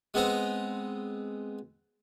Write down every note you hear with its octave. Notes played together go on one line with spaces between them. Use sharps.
G#3 B3 C4 A#5